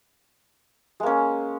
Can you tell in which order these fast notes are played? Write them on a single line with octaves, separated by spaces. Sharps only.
G#3 A#3 C#4